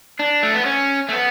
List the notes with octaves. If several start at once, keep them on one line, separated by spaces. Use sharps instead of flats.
D4
A3
B3
C#4
A3
B3